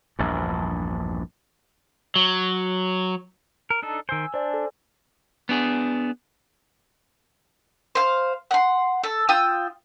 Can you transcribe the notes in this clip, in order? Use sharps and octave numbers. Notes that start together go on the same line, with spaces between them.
A#1 E2 G2
F#3
A#4
D4 D#4 A4
D#3 C5 G#5 E6
D4 C5 D5 G#5
A4
B3 D4 G#4
C5 F5
F#5 C6
A4
F4 G5 D#6 E6